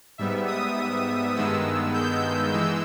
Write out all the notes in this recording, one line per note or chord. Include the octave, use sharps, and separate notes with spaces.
G#2 G3 B3 E5
D#6
G2 D#3 G#3 B3 E6
G6
E3 G#3 E6